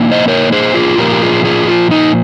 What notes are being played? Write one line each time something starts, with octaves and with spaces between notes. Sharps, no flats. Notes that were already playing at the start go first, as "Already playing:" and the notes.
Already playing: A#2 F3 A#3 D#4
C5 D#5
A#4 C#5
G#4 C5
F4 G#4
A#2 F3 A#3 G4 A#4
G4
F4 G#4
F4 G#4
F4
D#4